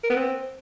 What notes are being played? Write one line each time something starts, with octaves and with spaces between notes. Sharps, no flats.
A#4
B3
C4